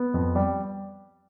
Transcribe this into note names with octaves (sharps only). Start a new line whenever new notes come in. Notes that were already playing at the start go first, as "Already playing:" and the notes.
Already playing: B3
F2
G3